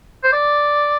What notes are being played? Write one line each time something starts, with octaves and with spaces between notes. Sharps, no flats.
C5
D5